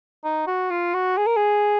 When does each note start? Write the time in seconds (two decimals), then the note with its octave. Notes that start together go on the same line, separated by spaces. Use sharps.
0.24 D#4
0.47 F#4
0.70 F4
0.94 F#4
1.17 G#4
1.27 A#4
1.36 G#4